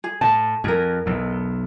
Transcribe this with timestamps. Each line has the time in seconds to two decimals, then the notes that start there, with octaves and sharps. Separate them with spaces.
0.04 G#4
0.21 A2 A5
0.64 F2 G#4 A#4
1.06 B1 E2